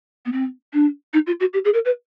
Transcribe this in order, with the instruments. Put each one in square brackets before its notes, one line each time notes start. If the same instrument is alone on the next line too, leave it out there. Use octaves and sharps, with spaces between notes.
[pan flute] B3
C4
D4
D#4
F4
F#4
G4
G#4
A#4
B4